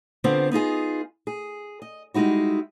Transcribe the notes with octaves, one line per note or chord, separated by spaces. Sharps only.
D3 B3 C4 F4 C5
B3 D#4 F4 G#4
G#4
D#5
G3 G#3 D#4 E4 F#4